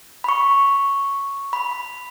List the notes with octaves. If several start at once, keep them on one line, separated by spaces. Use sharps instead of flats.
B5 C#6
B5